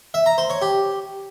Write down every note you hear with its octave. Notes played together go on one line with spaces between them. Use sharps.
E5
A#5
C5
C#5
G4